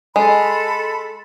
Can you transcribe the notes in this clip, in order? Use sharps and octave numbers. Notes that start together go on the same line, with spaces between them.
G#3 A4 B5 C6